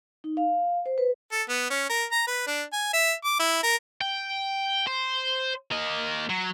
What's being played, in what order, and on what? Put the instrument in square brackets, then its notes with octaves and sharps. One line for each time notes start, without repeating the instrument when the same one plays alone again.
[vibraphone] D#4
F5
C5
B4
[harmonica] A4
B3
C#4
A#4
A#5
B4
D4
G#5
E5
D6
E4
A#4
[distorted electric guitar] G5
C5
A#3 D#5
F#3